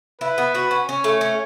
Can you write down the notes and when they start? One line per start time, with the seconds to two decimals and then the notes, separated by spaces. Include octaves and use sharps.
0.21 E4 B4
0.38 B3
0.55 F#4
0.71 C#4
0.89 C#4 C#5
1.04 A3
1.21 C#4